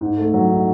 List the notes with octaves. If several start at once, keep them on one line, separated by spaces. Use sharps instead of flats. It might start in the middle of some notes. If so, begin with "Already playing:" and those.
G#2
A3
F#3
D#4